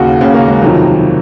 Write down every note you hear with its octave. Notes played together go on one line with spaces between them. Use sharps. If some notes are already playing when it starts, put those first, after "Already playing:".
Already playing: D#2 C#3 F#4
D#2 C#3 C#4
A#3
G#3
F2 C3 D#3 F#3